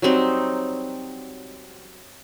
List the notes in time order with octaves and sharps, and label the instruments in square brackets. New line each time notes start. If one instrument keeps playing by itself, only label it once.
[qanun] F#3 G3 C4 D#4